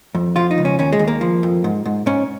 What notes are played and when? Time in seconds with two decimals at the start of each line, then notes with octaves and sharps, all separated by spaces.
0.15 F2
0.36 F3 F4
0.51 D#4
0.58 C#2
0.65 C#4
0.79 D#2 C#4
0.93 G#3
0.99 D#2
1.08 A#3
1.21 F3
1.43 F2
1.64 G#2
1.86 G#2
2.06 G#2 C#4